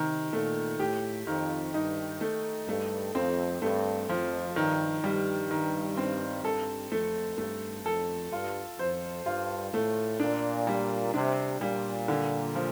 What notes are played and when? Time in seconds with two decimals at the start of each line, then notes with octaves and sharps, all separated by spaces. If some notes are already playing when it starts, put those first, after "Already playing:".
Already playing: C3 D#3
0.33 A#2 A3
0.80 A2 G4
1.27 F2 D#3
1.74 G2 D#4
2.21 A3
2.68 G2 A3
3.15 F2 C4
3.62 G2 A3
4.09 F2 F3
4.55 G2 D#3
5.03 G2 G3
5.51 D#3
5.97 C4
6.44 G2 A4
6.91 F2 A3
7.38 G2 A3
7.85 F2 A4
8.32 G2 F4
8.79 F2 C5
9.26 G2 F4
9.73 A2 A3
10.20 A#2 D4
10.67 G3
11.14 C3 D4
11.61 A#2 G3
12.08 D3
12.55 F3